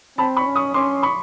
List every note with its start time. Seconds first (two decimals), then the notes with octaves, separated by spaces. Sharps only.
0.18 C4 A5 B5
0.37 B5 C#6
0.46 C#4
0.56 C#6 D#6
0.74 C#4 C6 D6
1.03 B5 C#6